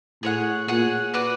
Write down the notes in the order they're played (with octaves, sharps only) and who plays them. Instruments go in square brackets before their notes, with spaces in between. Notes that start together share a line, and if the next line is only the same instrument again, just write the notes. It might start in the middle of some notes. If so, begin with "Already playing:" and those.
[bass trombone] A2 [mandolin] G#4 C#5 F#5
[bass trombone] A#2 [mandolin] G#4 C#5 F#5
[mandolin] F#4 B4 D5 F#5